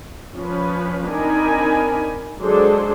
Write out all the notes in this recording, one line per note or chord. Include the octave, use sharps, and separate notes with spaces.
F3 C#4 B4
C4 D4 D#4 A#4 G#5 B5
F#3 G#3 D4 G#4 A4 C5